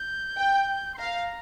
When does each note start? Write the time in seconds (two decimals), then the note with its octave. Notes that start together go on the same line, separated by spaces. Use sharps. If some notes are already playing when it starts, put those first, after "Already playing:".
Already playing: G6
0.37 G5
0.94 C6
0.98 F5 A#5